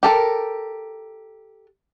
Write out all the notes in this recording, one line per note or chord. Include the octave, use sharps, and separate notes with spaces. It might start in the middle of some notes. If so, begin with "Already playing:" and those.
G4 A4 A#4